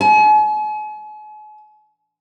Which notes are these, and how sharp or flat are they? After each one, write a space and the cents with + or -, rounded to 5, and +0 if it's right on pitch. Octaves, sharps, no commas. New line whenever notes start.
G#5 +40